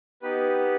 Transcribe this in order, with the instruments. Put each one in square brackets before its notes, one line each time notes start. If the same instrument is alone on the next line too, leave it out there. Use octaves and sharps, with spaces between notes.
[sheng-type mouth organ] B3 D#4 G4 B4